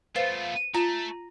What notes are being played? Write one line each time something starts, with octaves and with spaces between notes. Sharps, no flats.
A3 B3 F4 B4 C5
A3 F4 A#5